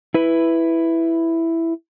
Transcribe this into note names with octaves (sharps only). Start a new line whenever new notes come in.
E4 B4